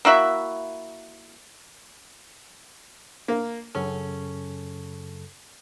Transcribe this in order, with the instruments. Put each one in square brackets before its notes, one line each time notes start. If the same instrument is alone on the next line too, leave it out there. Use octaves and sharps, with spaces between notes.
[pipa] A#3 E4 F#4 E5
[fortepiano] A#3
[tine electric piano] F#2 C#3 A4 [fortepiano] C#4